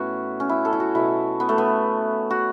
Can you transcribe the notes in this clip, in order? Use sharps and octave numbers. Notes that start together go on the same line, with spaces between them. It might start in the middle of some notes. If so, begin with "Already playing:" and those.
Already playing: A2 E3 A3 B3 C#4 E4 F#4
C#4
E4
A4
E4
F#4
B2 F#3 A3 E4
B3
A3
B3
F#4